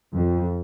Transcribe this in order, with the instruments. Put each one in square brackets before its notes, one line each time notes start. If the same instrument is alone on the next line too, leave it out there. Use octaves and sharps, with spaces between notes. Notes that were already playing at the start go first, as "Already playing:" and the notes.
[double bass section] F2